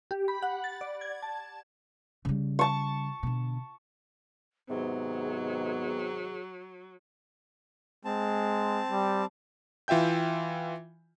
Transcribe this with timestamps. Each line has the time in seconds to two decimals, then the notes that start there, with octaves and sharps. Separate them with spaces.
0.11 G4
0.28 B5
0.43 F#5
0.64 A6
0.81 D5
1.01 G#6
1.23 A5
2.25 C#3 G3
2.59 A5 C#6
3.23 B2 D3
4.69 G#2 C3 D#3 F#3 B3 G#4
8.05 G#3 C4 A5
8.91 G3
9.88 E3 F4 E5 G5 G6